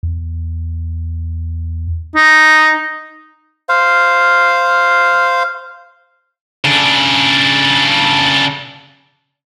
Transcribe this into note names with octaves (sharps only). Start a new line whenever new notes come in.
E2
D#4
C5 F5
C#3 D4